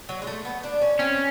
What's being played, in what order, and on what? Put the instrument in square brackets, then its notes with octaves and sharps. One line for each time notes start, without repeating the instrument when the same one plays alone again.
[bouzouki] F#3
G#3
A3
B3
D4
C#4
[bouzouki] C4 [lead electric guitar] C#4